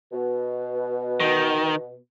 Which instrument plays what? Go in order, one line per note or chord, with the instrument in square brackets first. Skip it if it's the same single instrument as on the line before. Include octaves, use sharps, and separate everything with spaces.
[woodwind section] B2
[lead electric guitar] D#3